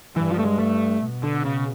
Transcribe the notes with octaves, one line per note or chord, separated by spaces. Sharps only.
G2 E3
F3
A3
G#3
A3
B2
D3
C#3